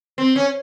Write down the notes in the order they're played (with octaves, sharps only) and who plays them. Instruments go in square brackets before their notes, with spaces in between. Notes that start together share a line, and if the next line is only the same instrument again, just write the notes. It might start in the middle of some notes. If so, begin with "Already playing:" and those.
[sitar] C4
C#4